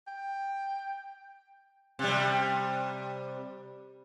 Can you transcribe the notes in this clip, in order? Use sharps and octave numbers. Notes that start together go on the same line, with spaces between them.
G5
C3 G3